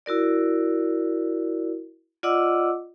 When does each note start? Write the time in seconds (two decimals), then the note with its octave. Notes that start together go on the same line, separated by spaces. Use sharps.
0.06 E4 F#4 A#4 D5
2.23 F4 D5 D#5 F#5 D6 E6